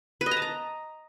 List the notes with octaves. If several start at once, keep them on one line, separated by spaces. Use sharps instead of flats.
B4
D#5
A#5
A5
A#5